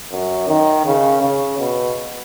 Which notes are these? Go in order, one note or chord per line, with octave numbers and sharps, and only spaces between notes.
F#2
D#3
C#3
C#3
B2